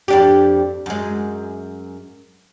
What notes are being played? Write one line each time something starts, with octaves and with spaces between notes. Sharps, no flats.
F2 D4 G4
F#2 G#3